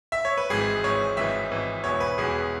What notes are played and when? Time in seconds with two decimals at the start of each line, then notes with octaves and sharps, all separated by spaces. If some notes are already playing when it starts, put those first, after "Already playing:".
0.12 E5
0.25 C#5
0.37 B4
0.50 G#1 G#2 E3 G#4
0.83 G#1 G#2 E3 C#5
1.17 G#1 G#2 E3 E5
1.51 G#1 G#2 E3
1.84 E1 E2 E3 C#5
2.00 B4
2.18 E1 E2 E3 G#4